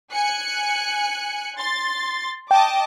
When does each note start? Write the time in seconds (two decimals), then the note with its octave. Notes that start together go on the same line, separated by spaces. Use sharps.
0.14 G#5 F#6 C#7
1.58 C6 A6
2.51 D#5 G5 A5 D6